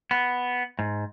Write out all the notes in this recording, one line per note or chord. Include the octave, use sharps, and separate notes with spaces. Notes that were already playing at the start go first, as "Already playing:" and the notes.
B3
G#2